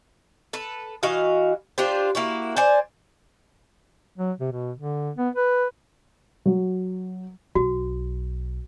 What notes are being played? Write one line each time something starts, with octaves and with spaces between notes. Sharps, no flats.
A4 B4
E3 F#4 D#5 F5
D4 F4 G4 C5
A#3 E4 F#4
C5 D5 G#5
F#3
C3
B2
D3
B3
B4
F#3
B1 F#4